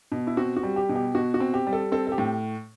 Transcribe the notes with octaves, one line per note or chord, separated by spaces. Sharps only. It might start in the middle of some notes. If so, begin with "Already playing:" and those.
B2
E4
C4 F#4
F#4
G3
G4
B2
G4
B2 F#4
F#4
C4
G4
G3
A4
C4 A4
A4
G4
A2